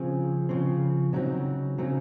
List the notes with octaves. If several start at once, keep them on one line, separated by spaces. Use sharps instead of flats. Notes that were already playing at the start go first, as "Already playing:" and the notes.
Already playing: C#3 F3 C4 G#4
C#3 F3 C4
C#3 F#3 C4 D#4
C#3 F#3 C4 D#4